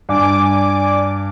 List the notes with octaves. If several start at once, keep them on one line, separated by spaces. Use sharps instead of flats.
G2 D5 G#5 D6